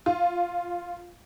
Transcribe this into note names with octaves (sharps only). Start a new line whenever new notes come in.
F4